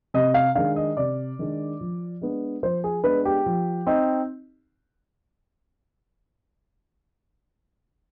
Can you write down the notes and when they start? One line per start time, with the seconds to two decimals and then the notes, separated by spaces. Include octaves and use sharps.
0.14 C3 D#5
0.34 F5
0.55 D#3 G#3 D4 F5
0.76 D#5
0.97 C3 D5
1.39 D#3 G#3 D4
1.81 F3
2.21 G#3 B3 D4
2.63 F3 C5
2.84 G#4
3.04 G#3 B3 D4 B4
3.25 G4
3.46 F3
3.87 C4 D#4